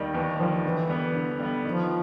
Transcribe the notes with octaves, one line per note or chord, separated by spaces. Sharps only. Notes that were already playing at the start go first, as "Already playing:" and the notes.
Already playing: D#2 D#3 G3
D#2 E3
D#3 F3 G3
D3 E3
G3 B3
D3
G3 B3
D#3 F3